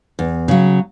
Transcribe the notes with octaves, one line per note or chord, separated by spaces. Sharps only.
E2
C#3 F#3